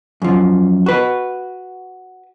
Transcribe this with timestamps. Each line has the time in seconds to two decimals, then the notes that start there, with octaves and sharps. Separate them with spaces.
0.22 F#2 F3
0.86 F#4 B4